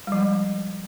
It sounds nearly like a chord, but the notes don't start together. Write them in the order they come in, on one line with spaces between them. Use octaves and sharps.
G3 F3 G#3